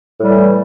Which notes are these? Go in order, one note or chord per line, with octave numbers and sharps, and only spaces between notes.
A2 E3 G3 A3